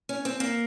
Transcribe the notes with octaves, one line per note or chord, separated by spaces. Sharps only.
C#4
C4
A#3